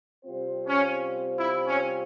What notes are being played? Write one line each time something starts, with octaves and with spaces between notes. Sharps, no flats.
C3 G3 C4 F4 C5
C#4
E4
C#4